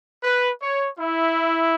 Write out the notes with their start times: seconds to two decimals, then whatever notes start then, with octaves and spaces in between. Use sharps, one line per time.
0.23 B4
0.61 C#5
0.99 E4